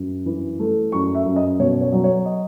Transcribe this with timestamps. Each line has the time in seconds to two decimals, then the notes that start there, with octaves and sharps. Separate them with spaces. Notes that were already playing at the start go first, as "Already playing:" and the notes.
Already playing: F#2
0.26 E3
0.59 A3
0.92 F#2 C#6
1.15 E5
1.25 F#2
1.36 D#5
1.59 B2 C#5
1.81 C#5
1.92 F#3
2.04 C#5
2.26 D#5